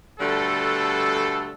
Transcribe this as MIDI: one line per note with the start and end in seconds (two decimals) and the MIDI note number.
0.19 1.50 47
0.19 1.50 50
0.19 1.50 55
0.19 1.50 57
0.19 1.50 69